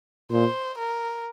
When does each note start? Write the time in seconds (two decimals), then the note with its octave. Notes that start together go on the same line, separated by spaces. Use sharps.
0.31 A#2 C5
0.78 A#4